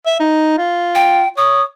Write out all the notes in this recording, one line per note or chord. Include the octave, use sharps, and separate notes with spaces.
E5
D#4
F4
G5
C#5 D#6